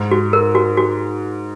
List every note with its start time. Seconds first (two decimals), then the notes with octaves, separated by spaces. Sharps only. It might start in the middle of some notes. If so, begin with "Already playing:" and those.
Already playing: G#2
0.11 F#4
0.33 A#4
0.55 F#4
0.77 F#4